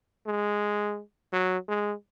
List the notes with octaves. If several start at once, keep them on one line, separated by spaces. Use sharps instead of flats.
G#3
F#3
G#3